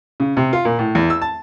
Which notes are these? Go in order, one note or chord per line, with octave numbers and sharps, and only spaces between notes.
C#3
C3
F4
A#2
A2
E2
E6
A5